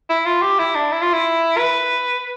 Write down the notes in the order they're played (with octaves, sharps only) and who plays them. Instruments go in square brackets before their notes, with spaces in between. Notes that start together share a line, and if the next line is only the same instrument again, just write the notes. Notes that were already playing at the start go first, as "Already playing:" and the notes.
[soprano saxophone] E4
F4
G4
E4
D4
E4
F4
E4
B4